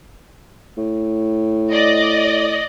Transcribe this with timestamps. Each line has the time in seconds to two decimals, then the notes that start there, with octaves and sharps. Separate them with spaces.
0.77 A2
1.72 D5 D#5